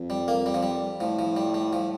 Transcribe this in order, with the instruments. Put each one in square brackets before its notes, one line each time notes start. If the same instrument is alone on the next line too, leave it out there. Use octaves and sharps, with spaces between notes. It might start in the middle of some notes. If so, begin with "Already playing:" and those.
Already playing: [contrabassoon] F2
[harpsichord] G3
A#3
G3
F3
G3
[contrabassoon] A2 [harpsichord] F3
[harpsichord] F3
G3
G3
F3